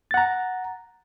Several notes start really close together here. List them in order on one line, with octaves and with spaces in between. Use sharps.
A6 F#5 A#5